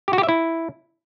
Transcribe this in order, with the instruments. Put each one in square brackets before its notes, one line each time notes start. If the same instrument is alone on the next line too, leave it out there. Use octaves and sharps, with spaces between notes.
[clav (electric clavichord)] G4
F#4
G4
E5
E4